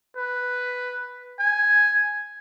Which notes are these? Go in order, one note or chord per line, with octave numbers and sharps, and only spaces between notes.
B4
G#5